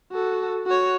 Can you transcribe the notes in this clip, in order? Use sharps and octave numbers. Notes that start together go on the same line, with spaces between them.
F#4 A4
F#4 C#5